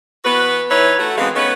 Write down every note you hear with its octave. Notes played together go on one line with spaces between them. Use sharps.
E3 B3 F#4 B4
E3 D#4 E4 B4 C#5
A3 F#4
F#2 E3 G#3 B3 C4 F5
A3 B3 C#4 D#4 B4